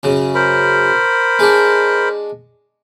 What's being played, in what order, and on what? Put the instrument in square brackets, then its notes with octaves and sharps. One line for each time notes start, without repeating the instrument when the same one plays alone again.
[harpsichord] F#2 C#3
[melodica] A#4 C5 B5
[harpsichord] G#3 D4